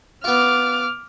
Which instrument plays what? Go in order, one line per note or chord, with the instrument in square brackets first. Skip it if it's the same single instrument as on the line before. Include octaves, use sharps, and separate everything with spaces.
[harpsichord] B3 F4 [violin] D6 F6